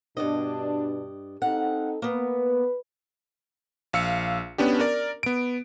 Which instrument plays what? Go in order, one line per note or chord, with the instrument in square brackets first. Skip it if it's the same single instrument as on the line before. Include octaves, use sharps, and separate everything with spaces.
[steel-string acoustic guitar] G2 D5 D#5 [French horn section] B2 D4
[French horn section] C4 D#4 A4 [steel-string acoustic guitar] F5 F#5
[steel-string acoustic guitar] A#3 B3 [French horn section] B4
[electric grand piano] A#1 F5 E6 C#7
B3 C#4 D4 G4
A#4 D5
B3 D7